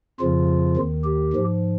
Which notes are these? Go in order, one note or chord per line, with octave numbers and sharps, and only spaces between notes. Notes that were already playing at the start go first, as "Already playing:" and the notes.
F2 C#3 F3 F4
D#2 D#3
G4
G#2 F3